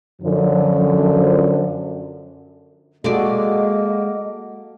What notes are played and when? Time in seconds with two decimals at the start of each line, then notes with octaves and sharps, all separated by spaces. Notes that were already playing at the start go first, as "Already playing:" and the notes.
0.22 F#2 D3 F3
3.04 G#3 A#3 F#4 G4 A4 D5 D#5